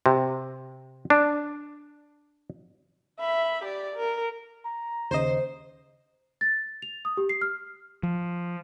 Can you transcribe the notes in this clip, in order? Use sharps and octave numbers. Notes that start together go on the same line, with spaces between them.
C3
D4
E5 B5
G4 D5
A#4
A#5
D#2 C#3 C5 D#5
A6
F7
D#6
G4
C7
F6
F3